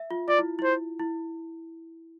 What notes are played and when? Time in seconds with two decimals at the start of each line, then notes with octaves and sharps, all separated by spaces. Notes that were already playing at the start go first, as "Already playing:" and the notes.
Already playing: E5
0.11 F4
0.28 F4 D5
0.38 E4
0.59 E4 C5
0.99 E4